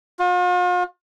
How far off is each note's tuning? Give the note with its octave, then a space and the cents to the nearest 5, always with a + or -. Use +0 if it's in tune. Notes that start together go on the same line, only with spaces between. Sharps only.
F4 +45